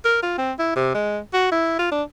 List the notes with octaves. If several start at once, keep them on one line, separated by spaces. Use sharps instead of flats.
A#4
F4
C4
E4
C3
G#3
F#4
E4
F4
D4